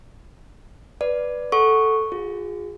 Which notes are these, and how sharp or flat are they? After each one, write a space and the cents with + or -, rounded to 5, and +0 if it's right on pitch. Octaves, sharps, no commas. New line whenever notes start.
B4 +0 D5 +0
A4 +0 F#5 +0 C#6 +0
F4 +35 G#4 -15